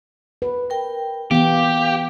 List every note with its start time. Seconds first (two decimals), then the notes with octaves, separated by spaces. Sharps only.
0.42 B4
0.70 A#4 G5
1.31 E3 B3 G4 F5 G5